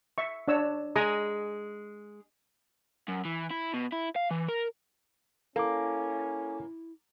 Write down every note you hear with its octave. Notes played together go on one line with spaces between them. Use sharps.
E5 C#6
D4 C#5 E6
G#3 G#5 A#5 D#6
F#2
E3
E4
B2
E4
F5
E3
A#4
A#3 C#4 E4 A4 D6